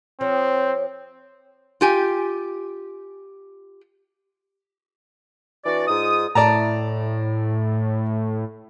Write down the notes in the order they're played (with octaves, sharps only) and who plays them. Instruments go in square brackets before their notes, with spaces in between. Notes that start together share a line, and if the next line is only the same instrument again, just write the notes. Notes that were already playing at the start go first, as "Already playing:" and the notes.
[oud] F3 [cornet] C4 [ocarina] C#5
[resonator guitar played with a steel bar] F4 G4 G#5
[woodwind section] E3 D4 F#4 D5
G#2 D#4 F4 D#6
[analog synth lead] A2 [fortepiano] D5 A5 A#5